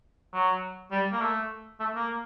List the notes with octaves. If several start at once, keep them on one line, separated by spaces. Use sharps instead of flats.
F#3
G3
A#3
A3
A3
A#3